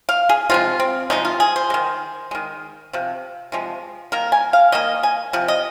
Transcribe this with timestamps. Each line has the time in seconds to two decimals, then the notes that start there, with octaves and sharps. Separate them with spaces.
0.09 F5
0.29 G#4
0.50 C3 F3 G#3 F4
0.80 C4
1.10 C3 F3 G#3 D#4
1.25 F4
1.40 G#4
1.56 C5
1.70 G#3
1.74 D#3
2.31 D#3 G#3
2.93 C3 F3
3.52 C3 F3 G#3
4.12 D#3 A#3 A#4
4.32 G#5
4.53 F5
4.72 D#3 A#3 D#5
5.03 G#5
5.33 C3 F3
5.48 D#5